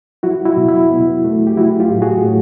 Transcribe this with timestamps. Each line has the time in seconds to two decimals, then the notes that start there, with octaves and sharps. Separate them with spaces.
0.23 F#3 E4 F#4
0.45 E4 F#4
0.57 B2
0.68 E4
0.91 B2
1.25 A3
1.47 G4
1.57 F#3 E4 F#4
1.80 F4 G4
1.91 A2
2.02 F#4 G#4
2.24 A2